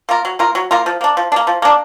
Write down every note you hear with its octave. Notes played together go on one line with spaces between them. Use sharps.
A#3 F4 A#4
F#3
A#3 F4 A#4
F#3
A#3 F4 A#4
F3
A#3 D4
F3
D4
A#3
F3
A#3 D4